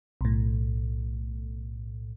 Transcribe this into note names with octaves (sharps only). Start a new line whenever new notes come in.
B1 A2